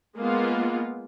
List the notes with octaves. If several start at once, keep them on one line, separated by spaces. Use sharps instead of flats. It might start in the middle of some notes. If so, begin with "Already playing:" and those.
G#3 A#3 B3 F4